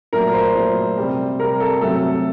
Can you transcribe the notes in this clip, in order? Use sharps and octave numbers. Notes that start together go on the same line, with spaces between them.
A#2 F#3 A3 A#4
C5
A#2 F#3 A3
C3 G3
C3 G3 A#4
A4
C3 F#3 A3 A4